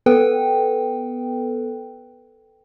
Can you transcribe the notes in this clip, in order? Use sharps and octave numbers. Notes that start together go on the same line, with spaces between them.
B3 A4 B4 G5